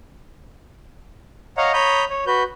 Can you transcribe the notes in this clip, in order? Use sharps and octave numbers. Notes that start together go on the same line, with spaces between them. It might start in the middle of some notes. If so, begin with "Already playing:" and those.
C#5 D#5 F5 F#5 A#5
C#5 A#5 B5 D#6 G6
C#5
F#4 B4 G6